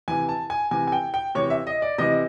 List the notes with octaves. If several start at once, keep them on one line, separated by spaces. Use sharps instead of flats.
C3 E3 G#5
A5
G#5
C3 E3 G#5
G#5
G5
G5
C3 E3 C#5
E5
D#5
D5
C3 E3 D#5